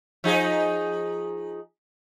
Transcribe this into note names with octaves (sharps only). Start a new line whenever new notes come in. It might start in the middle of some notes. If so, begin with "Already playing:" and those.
F3 D#4 G#4